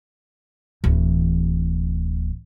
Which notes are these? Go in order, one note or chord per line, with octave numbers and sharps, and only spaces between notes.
D1 E3